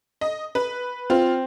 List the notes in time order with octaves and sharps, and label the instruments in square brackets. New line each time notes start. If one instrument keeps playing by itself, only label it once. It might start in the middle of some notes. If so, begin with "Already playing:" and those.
[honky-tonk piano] D#5
B4
[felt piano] C4 [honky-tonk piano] F4